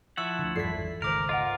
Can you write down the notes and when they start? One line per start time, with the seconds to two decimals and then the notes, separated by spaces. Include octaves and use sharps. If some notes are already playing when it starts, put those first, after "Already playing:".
0.17 F3 E4 F#5 C#6 E6
0.39 D2 D3
0.56 G#1 E2 G2 F4 A4 D5 B6 C7
1.02 G#1 C#2 D#3 A#4 C5 D6 F6
1.29 F4 A#4 D#5 F#5